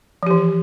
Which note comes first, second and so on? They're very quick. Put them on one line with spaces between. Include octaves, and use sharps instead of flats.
F3 G4 E3